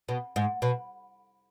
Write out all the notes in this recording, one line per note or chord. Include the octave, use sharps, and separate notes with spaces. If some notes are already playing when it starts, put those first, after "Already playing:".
B2
G#2
B2